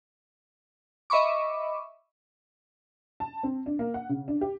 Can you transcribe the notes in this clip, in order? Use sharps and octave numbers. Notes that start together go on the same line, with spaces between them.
D#5 E5 B5 C#6 D6
A5
C4
D4
A#3
F#5
C#3
D4
G4